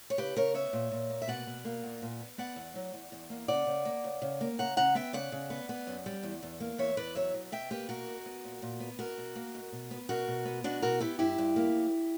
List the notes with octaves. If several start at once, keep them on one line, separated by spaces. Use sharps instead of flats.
C#5
C#3 G4 B4
C#3 A#4 C#5
B3 C#5 E5
A#2
A#2
A#3
E5
B2 D5 F#5
B2
A#3
A#2
A#2
B3
B3 D5 F#5
E2
F#3
E2
E2
A#3
C#3 D5 F#5
C#3
A#3
C#3
C#3
A#3
C#3 F#5 A#5
C#3 F#5 A#5
B3 E5 G5
C#3 D5 F#5
C#3
B3
B3
F#2
G3
E2
E2
A#3
E2 C#5 E5
E2 B4 D5
F#3 C#5 E5
B2
B2 E5 G5
A#3 G4 B4
B2 F#4 A#4
B2
B3
A#2
A#2
B3
B2 F#4 A#4
B2
A#3
B2
B2
B3
B2 F#4 A#4
B2
B3
B2 D4 F#4
B2 F#4 A#4
B3 E4 G4
G2 E4 G4
G2
A#3
F#2